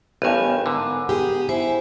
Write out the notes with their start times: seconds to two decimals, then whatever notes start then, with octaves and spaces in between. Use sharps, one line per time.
0.22 A1 G2 B3 A#4 G#5
0.66 G#2 D3
1.09 G4 G#4
1.49 E4 C5 G#5